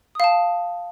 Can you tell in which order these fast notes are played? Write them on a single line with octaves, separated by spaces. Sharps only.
D#6 F5 A5